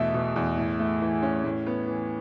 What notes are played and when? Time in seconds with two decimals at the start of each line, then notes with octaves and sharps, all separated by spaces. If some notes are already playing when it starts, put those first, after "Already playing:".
Already playing: E2 B2 A3 E5
0.14 B2
0.36 E2
0.58 A2
0.79 A3
1.02 E3
1.23 C#4
1.44 A2
1.67 B3
1.88 E3